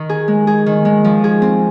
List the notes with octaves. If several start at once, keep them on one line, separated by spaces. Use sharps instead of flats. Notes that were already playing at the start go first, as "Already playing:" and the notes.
Already playing: D#3 D#4
G#4
G#3
G#4
D#3
G#3
F3
G#4
C4